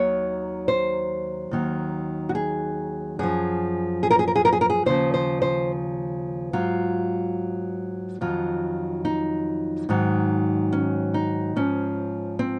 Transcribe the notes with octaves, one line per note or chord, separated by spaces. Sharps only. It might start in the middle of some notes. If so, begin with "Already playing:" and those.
Already playing: D#2 D#3 F#3 C#5
C5
D#2 D#3 F#3
F#4
G#4
F#2 F3 G#4
G#4
A#4
G#4
A#4
G#4
A#4
G#4
A#4
G#4
D#2 C#3 F3 C5
C5
C5
G#2 F#3 F4
F2 D#3 F#3 F4
D#4
G#2 D#3 F#3
C#4
D#4
G#2 F3 C#4
C4